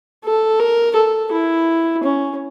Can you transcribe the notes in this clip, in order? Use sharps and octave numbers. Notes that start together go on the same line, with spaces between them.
A4
A#4
A4
E4
C#4